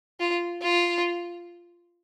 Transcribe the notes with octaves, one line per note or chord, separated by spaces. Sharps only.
F4
F4